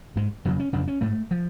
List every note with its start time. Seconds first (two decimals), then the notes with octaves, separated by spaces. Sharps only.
0.16 G#2 G#3
0.45 F2 C#3 F#3
0.60 C#4
0.73 F2 C#3 D4
0.88 C#4
1.01 G#2 A3
1.31 F3